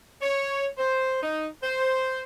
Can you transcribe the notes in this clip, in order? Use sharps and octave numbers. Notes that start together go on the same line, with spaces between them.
C#5
C5
D#4
C5